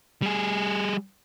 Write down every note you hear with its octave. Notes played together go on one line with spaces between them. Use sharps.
G3 G#4